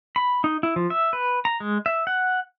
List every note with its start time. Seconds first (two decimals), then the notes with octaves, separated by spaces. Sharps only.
0.16 B5
0.44 D#4
0.63 E4
0.76 F3
0.90 E5
1.13 B4
1.45 A#5
1.60 G#3
1.86 E5
2.07 F#5